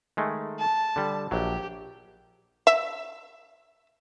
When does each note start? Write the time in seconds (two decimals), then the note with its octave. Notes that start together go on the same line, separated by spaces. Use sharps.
0.17 D#3 G#3 A3
0.58 A5
0.96 D3 G3
1.31 A#1 F#3 G4
2.67 E5